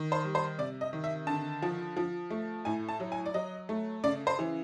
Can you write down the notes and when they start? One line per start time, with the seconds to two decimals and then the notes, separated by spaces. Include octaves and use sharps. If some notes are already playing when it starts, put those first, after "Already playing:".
Already playing: D#3
0.12 C5
0.24 G3
0.35 C5
0.58 C3 D5
0.81 D#5
0.93 D#3
1.04 E5
1.27 D3 A5
1.62 F3
1.97 F3
2.30 A3
2.65 A2 G#5
2.89 A5
3.00 F#3
3.12 G#5
3.26 D5
3.34 F#3 D#5
3.69 A3
4.04 C#3 D5
4.27 C5
4.39 E3